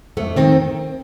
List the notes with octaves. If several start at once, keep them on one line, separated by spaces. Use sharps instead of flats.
F2 A3
D#3 C4